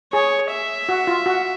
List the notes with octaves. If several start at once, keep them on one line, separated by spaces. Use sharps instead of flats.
G#4 C#5
E5
F#4
F4
F#4